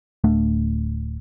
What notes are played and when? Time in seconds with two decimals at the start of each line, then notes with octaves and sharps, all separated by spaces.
0.24 D1 A3 D4